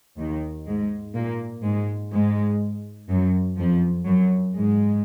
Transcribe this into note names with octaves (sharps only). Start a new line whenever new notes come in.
D#2 D#3
G#2 G#3
A#2 A#3
G#2 G#3
G#2 G#3
F#2 F#3
F2 F3
F#2 F#3
G#2 G#3